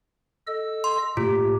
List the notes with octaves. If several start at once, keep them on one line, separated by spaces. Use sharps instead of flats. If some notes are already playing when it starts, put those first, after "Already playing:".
A4 D#5 E6
C6
A2 A#3 F4 G4